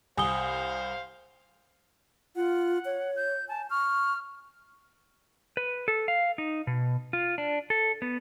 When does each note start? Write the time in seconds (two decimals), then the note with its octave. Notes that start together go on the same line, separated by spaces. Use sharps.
0.17 C2 C5 F5 G#5 D#6 G7
2.36 F4 F#5
2.85 C#5
3.16 G6
3.49 G#5 A5
3.70 C#6 F6
5.57 B4
5.88 A4
6.08 F5
6.38 D#4
6.67 B2
7.13 F4
7.38 D4
7.70 A4
8.02 B3